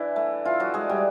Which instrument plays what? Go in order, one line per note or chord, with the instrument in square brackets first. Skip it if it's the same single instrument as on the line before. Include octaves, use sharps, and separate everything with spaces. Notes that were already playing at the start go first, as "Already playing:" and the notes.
Already playing: [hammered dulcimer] E3 D4 E4
A3
E3 F4
F#3 F#4
G#3 D4 G#4
G3 G4